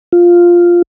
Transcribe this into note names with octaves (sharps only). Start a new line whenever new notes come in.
F4